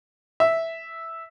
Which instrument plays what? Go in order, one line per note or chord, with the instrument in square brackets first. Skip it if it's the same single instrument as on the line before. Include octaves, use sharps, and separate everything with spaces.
[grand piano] E5